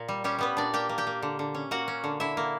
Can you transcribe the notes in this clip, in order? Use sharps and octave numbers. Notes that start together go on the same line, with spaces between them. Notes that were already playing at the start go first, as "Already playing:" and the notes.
Already playing: A#2
G3
G3 C#4 G4
G3 B3 B4
A#2 D4 D5
A#3 G4 G5
A#3
G4 G5
A#3
D3
D3
C#4
A#3 F#4 F#5
C#4
D3
D3 E4 E5
A#3